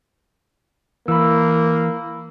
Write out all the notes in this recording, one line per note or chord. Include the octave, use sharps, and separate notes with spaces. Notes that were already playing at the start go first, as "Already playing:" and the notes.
E3 A#3 B5 E6